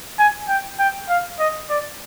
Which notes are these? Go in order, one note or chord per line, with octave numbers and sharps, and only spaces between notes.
G#5
G5
G5
F5
D#5
D5